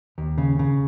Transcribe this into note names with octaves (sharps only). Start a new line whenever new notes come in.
D#2
C#3
C#3